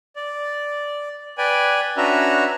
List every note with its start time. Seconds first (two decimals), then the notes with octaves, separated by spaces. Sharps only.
0.16 D5
1.38 B4 D5 G5 G#5
1.97 C#4 D4 F#4 B4 E5 A#5